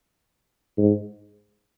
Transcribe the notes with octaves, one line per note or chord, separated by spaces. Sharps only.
G#2